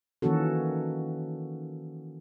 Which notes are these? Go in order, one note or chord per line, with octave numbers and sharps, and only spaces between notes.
D#3 E3 A#3 C#4 F#4 A4